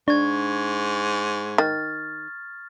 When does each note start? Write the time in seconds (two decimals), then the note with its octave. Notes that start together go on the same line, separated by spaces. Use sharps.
0.08 G#2 D4 C#6 G#6
1.58 D#3 F6 A6